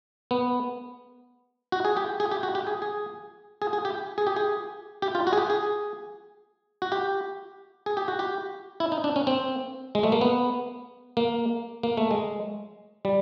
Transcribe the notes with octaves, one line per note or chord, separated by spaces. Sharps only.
B3
F#4
G#4
G4
G#4
G4
F#4
G4
G#4
G#4
G#4
G#4
G4
G#4
G4
G#4
G4
F4
F#4
G#4
G4
G#4
F#4
G4
G#4
G4
F#4
G4
E4
D#4
D4
C#4
C4
G#3
A3
A#3
B3
A#3
A#3
A3
G#3
G3